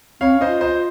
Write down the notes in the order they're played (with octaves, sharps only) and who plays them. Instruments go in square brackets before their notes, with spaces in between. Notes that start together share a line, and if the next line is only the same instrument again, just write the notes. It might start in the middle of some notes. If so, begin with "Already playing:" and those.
[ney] C4 [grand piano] C#5 F5
[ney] C#4
[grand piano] C5 D#5
[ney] F4
[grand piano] C5 D#5